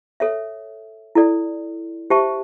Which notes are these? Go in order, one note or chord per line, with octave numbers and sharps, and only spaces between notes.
A4 C#5 E5
E4 A4 D5
G4 C5 E5 A5 C#6